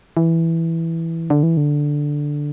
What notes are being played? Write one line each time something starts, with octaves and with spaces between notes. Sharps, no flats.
E3
D3
E3
D3